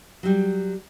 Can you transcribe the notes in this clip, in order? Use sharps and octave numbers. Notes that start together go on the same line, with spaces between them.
F#3 G3